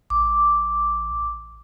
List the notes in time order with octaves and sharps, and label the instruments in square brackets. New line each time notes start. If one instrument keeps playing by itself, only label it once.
[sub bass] A1 [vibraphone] D6